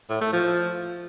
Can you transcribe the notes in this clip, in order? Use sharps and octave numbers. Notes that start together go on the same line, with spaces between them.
A2
A3
F3